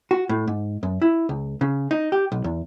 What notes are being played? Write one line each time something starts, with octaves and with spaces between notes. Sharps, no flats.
F#4
A2
G#2
F#2
E4
C#2
C#3
D#4
G4
B1
E2